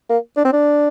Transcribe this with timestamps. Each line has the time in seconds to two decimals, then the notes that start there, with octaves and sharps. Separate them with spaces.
0.10 A#3
0.37 D4
0.45 C4
0.53 D4